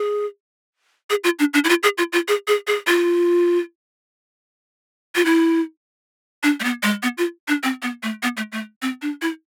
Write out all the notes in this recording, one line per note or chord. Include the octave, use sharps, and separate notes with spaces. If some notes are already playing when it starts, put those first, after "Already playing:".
Already playing: G#4
G#4
F4
D4
D4
E4
F4
G#4
F4
F4
G#4
G#4
G#4
F4
F4
E4
D4
A3
B3
G#3
B3
F4
D4
C4
B3
A3
B3
A3
A3
C4
D4
E4